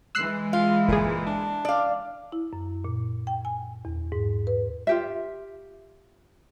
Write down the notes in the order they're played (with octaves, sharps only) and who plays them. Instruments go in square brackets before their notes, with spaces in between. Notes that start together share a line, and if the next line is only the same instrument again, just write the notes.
[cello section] E3 G#3 [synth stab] E6 F#6 C7
[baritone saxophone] F4 [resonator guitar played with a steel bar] F5
[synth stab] G1 G#4 [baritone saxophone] A#2
[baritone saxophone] D4
[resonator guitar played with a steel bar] D5 F5
[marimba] E4
F#2
A#2
G5
G#5
E2
G#2
B4
[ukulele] F4 G4 E5